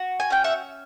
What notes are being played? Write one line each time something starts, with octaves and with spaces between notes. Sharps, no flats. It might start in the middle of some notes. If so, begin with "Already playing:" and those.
Already playing: F#4
G#5
C#4 G5
E5 F#5